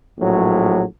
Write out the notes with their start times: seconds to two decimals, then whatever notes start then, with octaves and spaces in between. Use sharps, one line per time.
0.17 A#1 A2 F#3